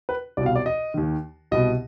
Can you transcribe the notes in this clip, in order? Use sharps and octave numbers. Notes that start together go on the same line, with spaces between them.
B4
C2 B2 D5
F5
D5
D#5
D#2 D#3
C2 B2 D#5